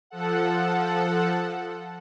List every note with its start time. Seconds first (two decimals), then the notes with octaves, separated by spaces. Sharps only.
0.10 F3 A4 F#5